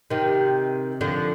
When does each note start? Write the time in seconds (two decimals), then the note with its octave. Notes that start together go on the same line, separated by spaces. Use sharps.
0.10 C3 D#3
1.01 D3 F3